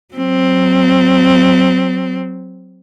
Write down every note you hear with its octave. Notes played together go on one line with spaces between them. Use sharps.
F#3 C4